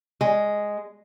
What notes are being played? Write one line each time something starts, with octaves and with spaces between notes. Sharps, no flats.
G#3